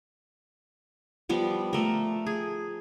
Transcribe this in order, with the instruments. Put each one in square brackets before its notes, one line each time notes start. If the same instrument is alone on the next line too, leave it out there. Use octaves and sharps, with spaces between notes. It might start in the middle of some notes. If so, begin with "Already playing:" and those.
[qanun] F3 G3 B3
A3 A#4
G#4